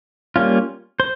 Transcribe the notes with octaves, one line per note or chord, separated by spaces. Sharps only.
G3 A#3 C#4 F4
C5